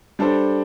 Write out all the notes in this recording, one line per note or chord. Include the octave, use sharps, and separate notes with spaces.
G3 D4 A4 C5